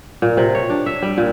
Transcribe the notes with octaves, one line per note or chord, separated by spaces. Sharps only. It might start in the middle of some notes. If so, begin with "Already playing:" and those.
A#2
C3
C#5
D4
E5
G3
A#2